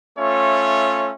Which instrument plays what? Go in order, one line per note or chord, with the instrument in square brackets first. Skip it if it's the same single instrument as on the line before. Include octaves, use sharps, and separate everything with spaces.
[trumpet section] A3 C#4 F4 C#5 E5